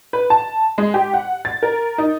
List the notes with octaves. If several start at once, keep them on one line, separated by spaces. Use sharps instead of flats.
B4
A5
G#3
G4
F#5
A6
A#4
D#4